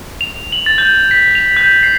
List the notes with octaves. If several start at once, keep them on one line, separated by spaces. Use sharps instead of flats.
F7
F#7
A6
G6
B6
F7
G6
C7